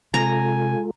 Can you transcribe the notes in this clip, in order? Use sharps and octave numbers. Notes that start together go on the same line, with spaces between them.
C3 G#3 F4 A4 G#5 A#5